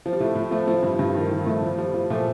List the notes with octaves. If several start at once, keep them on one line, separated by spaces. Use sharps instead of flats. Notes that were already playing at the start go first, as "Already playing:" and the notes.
F3
G3
A2 F3 A3
A2
F3 A3
F3 A3
G2
G2
D#3
D#3
A2 F3 A3
A2 F3
F3 G3
F3
A#2 F3 A3